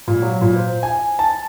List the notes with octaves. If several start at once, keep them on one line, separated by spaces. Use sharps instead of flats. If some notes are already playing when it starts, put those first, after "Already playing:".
A#2
F#3
A#2
C5
G#5
A5